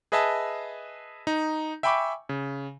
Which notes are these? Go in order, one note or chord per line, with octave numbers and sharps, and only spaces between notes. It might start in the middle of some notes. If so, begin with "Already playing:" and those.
G#4 B4 D#5 E5 G#5 A5
D#4
E5 G5 G#5 B5 C#6 D6
C#3